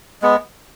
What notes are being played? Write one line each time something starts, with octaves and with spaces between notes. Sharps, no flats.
G#3 B3